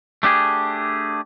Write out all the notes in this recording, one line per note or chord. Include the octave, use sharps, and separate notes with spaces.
A3 D4 G4 G#4